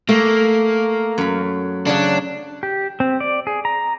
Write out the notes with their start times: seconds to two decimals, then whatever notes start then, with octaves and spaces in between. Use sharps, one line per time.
0.09 A3 A#3
1.18 F#2 B5
1.87 C#3 F#3 D4
2.63 G4
3.00 C4
3.20 D5
3.47 G#4
3.65 A#5